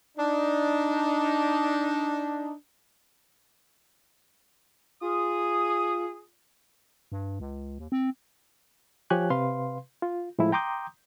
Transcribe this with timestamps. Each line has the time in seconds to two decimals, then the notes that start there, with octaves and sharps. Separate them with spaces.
0.18 D4 D#4
5.01 F4 G#4 D#6
7.12 G2
7.40 C#2
7.79 D#2
7.92 C4
9.10 F3 G4 C#5 G#5 F#6
9.30 C3 B4 F5 C6
10.02 F4
10.39 A2 F3 G#3 E4
10.52 G5 A#5 C6 D6 D#6 G6